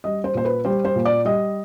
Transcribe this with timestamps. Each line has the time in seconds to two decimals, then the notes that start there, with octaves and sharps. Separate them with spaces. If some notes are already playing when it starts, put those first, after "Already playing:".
0.04 G3 D#5
0.24 C5
0.35 A#2 C5
0.45 B4
0.65 G3 C5
0.85 C5
0.96 A#2
1.05 D5
1.25 G3 D#5